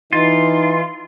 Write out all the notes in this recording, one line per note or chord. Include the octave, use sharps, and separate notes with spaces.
E3 D#4 F4